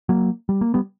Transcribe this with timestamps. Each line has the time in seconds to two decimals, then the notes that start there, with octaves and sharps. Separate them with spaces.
0.09 F#3 A#3
0.49 G3
0.61 A#3
0.74 G3 B3